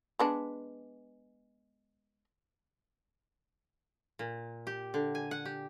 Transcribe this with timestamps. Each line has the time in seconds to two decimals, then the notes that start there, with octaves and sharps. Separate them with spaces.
0.19 G#3 B3 D4
4.19 A#2
4.67 G4
4.94 D3
5.15 G#5
5.31 F#5
5.45 G4